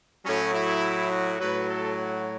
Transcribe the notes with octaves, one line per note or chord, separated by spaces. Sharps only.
A2 F#3 C#4
E4
F#4
A2 F#3 B4
A4
F#4